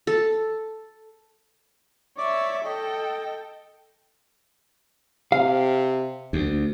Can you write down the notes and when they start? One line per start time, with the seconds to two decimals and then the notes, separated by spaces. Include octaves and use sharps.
0.07 A4
2.18 C#5 D5 E5 D6
2.64 A4 D#5 G5
5.32 C3 F5
6.33 D2